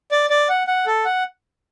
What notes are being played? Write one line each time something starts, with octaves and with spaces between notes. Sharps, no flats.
D5
D5
F#5
F#5
A4
F#5